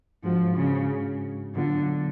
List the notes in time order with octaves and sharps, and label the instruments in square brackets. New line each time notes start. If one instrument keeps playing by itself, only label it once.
[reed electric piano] G#2 G#3 D4 F#4 [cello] F3
[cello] C#3
[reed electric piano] A2 F#3 B3 D4 F4 [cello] D3